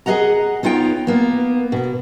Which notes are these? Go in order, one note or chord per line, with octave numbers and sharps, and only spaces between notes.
G#4 A4 D#5 F#5 A#5
B3 D#4 F4 C#5 G5
A#3 B3
B2